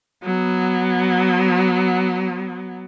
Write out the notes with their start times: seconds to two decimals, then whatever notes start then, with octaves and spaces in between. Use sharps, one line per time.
0.23 F#3 B3